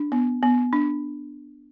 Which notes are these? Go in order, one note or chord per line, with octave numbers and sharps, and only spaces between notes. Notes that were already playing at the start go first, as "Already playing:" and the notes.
Already playing: D4
B3
B3
D4